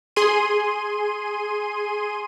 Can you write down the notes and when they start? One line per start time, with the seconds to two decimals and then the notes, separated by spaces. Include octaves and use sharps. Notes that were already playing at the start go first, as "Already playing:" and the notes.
0.16 G#4 C6 D#7